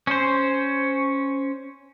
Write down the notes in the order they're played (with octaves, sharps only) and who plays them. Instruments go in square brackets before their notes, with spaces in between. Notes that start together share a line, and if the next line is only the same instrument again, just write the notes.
[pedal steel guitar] C#4 C5